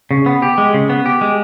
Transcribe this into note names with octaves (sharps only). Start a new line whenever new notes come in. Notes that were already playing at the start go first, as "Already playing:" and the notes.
C#3
B3
G4
G#3
C#3
B3
G4
G#3